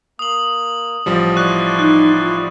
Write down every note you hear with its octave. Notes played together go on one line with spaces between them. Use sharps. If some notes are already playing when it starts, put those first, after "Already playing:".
A#3 D#6 F#7
A1 F3 G3
E4 D5 C6 C#6 F#6
D#4 F#6
F4